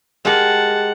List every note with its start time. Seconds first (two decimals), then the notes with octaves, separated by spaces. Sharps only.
0.25 G#3 G4 A#4 F#5 A5